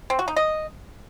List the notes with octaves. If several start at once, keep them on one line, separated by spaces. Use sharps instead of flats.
C4
F#4
D#4
D#5